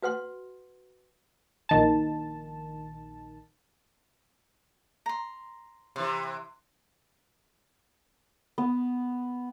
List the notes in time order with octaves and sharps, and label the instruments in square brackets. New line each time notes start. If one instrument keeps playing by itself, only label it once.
[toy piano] F#4 B4 F#5 C6
[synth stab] A#1 D#3 A5
[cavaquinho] A#5 C6
[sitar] C3 E3 [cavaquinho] C6
[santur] B3